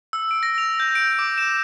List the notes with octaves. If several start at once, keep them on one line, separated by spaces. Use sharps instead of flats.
E6
D7
A#6
F7
G6
D7
D6
E7